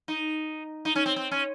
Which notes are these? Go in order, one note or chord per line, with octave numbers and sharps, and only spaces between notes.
D#4
D#4
C#4
C4
C4
C#4